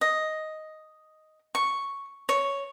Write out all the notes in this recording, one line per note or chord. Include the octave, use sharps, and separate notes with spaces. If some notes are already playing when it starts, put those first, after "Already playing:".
D#5
C#6
C#5